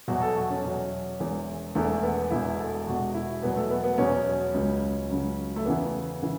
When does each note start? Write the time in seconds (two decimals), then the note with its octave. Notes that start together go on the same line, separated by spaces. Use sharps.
0.08 E2 B2 F#3 F#4
0.22 A4
0.36 F#4
0.50 C#4
0.64 E2 B2 F#3
1.20 E1 E2 E3
1.75 E1 E2 E3 A3
2.03 B3
2.30 E1 E2 B2 E4
2.59 A4
2.87 E1 E2 B2 F#4
3.14 E4
3.42 E2 B2 F#3 B3
3.56 A3
3.70 B3
3.84 B3
3.98 E2 B2 F#3 C#4
4.54 C#2 C#3 F#3
5.09 C#2 C#3 F#3
5.56 A3
5.65 E2 C#3 E3 B3
6.23 C#3 E3